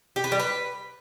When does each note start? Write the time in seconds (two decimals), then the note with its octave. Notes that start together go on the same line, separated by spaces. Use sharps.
0.16 G4
0.24 B4
0.32 G3
0.40 B4